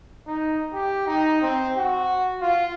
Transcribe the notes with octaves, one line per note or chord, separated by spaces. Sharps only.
D#4
G4
D#4
C4
F#4
F4